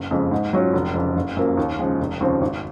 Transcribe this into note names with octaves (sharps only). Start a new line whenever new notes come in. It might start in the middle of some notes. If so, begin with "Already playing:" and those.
Already playing: F#1
F2 C#3 G#3
G#2
F#3 C#4 F4
F1
F2 C#3
F#1
F#2 F3 A#3
D#2
C#3 F3 G#3
F1
D#2 C#3 F3 C4
G#1